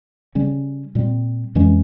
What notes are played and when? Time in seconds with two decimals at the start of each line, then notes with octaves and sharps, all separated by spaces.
0.35 C#3 G3 C#4
0.95 A#2 G3 C4
1.55 F2 E3 G#3 C#4